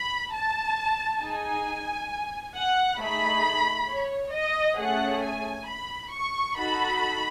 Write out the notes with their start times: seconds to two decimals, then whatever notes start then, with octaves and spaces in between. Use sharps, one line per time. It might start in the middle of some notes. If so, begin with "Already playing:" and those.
Already playing: B5
0.31 A5
1.20 D#4 G#4 G#5
2.54 F#5
2.99 A3 D#4 G#4 B5
3.88 C#5
4.33 D#5
4.78 A3 C#4 G#4 F#5
5.23 G#5
5.67 B5
6.12 C#6
6.57 D#4 F#4 A4 B5